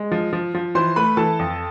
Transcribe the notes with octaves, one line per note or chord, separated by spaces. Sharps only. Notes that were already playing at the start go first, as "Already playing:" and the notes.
Already playing: G#3
F3
F3
F3
E3 C5 C6
A3 B4 B5
E3 A4 A5
F2